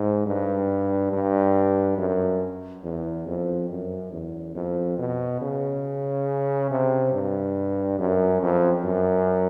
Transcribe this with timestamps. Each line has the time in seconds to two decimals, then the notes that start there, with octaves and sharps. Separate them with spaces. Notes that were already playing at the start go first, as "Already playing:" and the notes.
Already playing: G#2
0.26 G2
1.12 G2
1.98 F#2
2.83 E2
3.27 F2
3.70 F#2
4.12 E2
4.56 F2
4.99 B2
5.41 C#3
6.71 C3
7.13 G2
7.99 F#2
8.42 F2
8.85 F#2